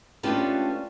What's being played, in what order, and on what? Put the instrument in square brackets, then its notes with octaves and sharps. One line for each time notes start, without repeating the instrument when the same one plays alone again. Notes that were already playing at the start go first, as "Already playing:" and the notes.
[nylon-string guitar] A3 C#4 D4 F4 G4 B4